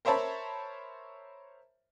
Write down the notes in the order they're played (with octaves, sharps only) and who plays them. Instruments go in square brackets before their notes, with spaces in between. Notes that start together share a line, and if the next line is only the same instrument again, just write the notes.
[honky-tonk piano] A#4 C5 C#5 E5 A5 B5